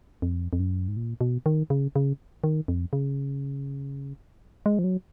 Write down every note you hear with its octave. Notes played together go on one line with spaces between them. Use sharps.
F2
F2
F#2
G#2
A#2
B2
D#3
C#3
C#3
D#3
F2
C#3
G#3
F3
F#3